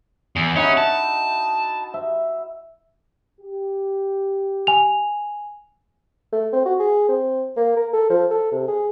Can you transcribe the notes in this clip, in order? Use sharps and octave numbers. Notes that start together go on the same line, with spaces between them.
E2
C#4 D#4 E4 F#4
A5
E5
G4
G#5 F7
A3
C4
F#4
G#4
C4
A#3
A#4
A4
F3
A4
C3
G#4